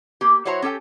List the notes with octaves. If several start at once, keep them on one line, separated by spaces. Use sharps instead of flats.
A#3 G4
F#3 E4 F#4 C5 C#5 A#5
C#4 G4 A4 G5